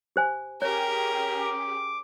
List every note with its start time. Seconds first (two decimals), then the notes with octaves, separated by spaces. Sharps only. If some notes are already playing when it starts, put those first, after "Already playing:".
0.16 G4 C5 G#5
0.62 C#4 G4 G#4 A#4 C#5
1.43 D6